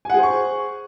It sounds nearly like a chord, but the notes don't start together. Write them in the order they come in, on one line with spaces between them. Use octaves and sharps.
G#5 F#5 G#4 C5 C#6